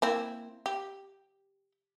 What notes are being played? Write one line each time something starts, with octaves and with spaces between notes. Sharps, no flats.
A#3 C4 E4
G4